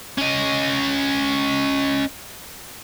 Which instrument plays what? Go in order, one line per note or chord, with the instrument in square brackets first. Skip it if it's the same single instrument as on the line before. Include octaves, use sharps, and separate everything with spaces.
[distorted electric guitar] C#4 D#5